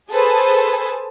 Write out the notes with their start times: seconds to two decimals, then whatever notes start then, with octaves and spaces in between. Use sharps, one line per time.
0.10 G#4 A4 B4 C5 G#5 A5